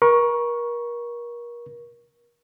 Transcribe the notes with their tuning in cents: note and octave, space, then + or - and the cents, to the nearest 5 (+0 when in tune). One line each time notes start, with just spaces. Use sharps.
A#4 +35 C#6 +0